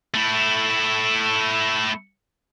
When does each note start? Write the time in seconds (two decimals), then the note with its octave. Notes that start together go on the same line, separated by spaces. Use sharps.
0.14 A3 E4